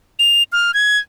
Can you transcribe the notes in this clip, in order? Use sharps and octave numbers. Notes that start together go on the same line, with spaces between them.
F7
F6
G#6